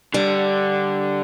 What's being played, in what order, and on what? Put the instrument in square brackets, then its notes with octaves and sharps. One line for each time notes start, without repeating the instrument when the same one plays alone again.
[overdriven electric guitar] D3 [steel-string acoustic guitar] G3